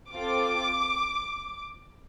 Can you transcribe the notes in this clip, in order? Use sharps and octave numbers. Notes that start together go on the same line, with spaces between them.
C4 F4 A4 D6